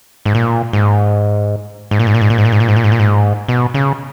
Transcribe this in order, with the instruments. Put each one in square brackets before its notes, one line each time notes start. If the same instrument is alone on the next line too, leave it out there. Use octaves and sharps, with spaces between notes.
[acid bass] G#2
A#2
G#2
G#2
A#2
G#2
A#2
G#2
A#2
G#2
A#2
G#2
A#2
G#2
A#2
G#2
A#2
G#2
B2
C#3